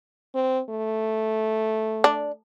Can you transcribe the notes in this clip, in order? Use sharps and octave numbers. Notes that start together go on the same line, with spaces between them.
C4
A3
D4